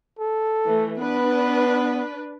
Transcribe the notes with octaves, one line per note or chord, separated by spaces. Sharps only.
A4
E3 A3
B3 D4 B4